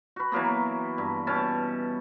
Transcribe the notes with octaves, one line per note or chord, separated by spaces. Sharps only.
F#4 B4
E3 F#3 A#3 B3
G2
B2 C#4 A5